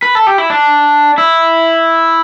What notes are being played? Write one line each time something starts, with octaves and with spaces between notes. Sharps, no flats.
B4
A4
G4
E4
D4
E4